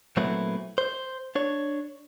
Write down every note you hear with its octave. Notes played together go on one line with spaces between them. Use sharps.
A#2 F#3 A3 B3 C4 E4
C5
D4 C#5